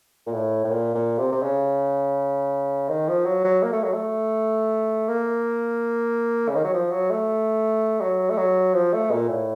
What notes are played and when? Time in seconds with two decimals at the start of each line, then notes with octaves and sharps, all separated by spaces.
0.27 A#2
0.34 A2
0.64 A2
0.71 A#2
0.95 A#2
1.18 C3
1.32 C3
1.43 C#3
2.89 D#3
3.08 F3
3.26 F#3
3.44 F#3
3.63 A#3
3.73 A3
3.84 F#3
3.93 A3
5.08 A#3
6.49 C#3
6.55 D#3
6.65 F#3
6.74 F3
6.92 F#3
7.11 A3
8.01 F#3
8.30 A3
8.38 F#3
8.74 F3
8.93 A3
9.11 A#2
9.29 A2